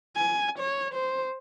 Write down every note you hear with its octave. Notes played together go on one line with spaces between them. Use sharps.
G#5
C#5
C5